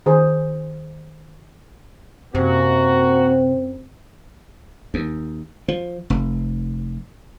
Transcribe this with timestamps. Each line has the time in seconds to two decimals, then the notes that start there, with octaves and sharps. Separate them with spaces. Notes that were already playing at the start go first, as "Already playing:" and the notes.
0.06 D#3 G#4 C5
2.35 F#2 C3 A#3 C4 F#4
4.94 D#2
5.68 F3
6.10 F1